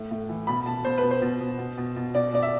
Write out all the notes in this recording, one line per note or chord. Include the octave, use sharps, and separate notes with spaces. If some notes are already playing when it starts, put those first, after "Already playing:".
Already playing: A2
A2
E3
B2 B5
B2 A5
B2 C5
B2 B4
C5
B2
B2
B2
B2
B2
B2 D5
B2 D5
E5